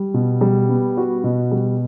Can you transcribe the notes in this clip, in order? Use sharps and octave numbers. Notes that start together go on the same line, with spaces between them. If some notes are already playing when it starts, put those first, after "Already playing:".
Already playing: G3
B2
G3
B3
F#4
B2
G3